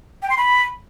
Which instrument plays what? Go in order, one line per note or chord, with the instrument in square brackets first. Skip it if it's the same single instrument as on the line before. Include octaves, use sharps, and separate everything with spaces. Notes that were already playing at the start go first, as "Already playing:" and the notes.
[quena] G5
C6
B5